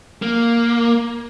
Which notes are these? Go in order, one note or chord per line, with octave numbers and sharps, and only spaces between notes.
A#3